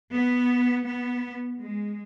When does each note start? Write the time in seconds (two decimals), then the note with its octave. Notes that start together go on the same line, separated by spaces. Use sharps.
0.12 B3
0.86 B3
1.59 G#3